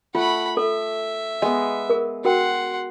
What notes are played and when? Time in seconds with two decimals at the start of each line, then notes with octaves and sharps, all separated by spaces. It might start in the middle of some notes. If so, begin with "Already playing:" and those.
0.15 A3 F4 F#5 B5
0.57 A4 E5
1.42 G#3 B3 D#5
1.90 G#4 A#4
2.25 F#4 A#4 F#5 G5 C6